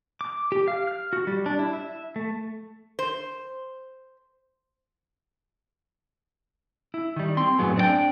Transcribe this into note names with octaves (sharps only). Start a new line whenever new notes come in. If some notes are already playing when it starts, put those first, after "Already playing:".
D6
G4
F5
F6
F#4
G3
D4
E4
E5
A3
C5
E4
D#3 G3
C4 C6
F#2 A2 F#3 B3 G#4
C4 D4 G4 G5